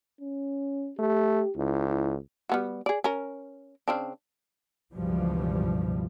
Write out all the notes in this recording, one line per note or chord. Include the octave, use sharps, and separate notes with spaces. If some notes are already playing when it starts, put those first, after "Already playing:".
C#4
A3 G4
C#2 E4
E4
G3 B3 F#4
G#4 D5
C#4 A#4
C#3 C4 D4
C#2 G2 B2 E3 F3 G3